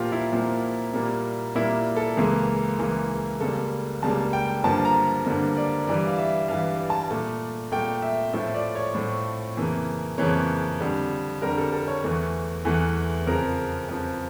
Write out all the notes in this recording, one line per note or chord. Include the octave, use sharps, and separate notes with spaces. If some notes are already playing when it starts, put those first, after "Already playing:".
Already playing: A#2 F3 A#3 F4 G4
E4
A#2 F3 A#3
A#2 G3 A#3
A#2 G3 A#3 E4
A4
C#2 C#3 E3 A#3
C#2 C#3 E3 A#3
C#2 C#3 G3 A#3 A4
C#2 C#3 G3 A#3 A5
G5
G2 D3 F3 A#3 A5
A#5
G2 D3 F3 A#3
D5
G2 E3 G3 D5
F5
E5
G2 E3 G3 F5
A5
A#2 A3
A#2 A3 G5
E5
A2 F3 A3 E5
D5
C#5
A2 F3 A3
F2 C#3 E3 A#3
F2 C#3 E3 A#3 C#5
F2 D3 G3
F2 D3 G3 A#4
A4
A4
C#5
E2 E3 A3
E2 E3 A3
F2 C#3 F3 A#4
F2 C#3 F3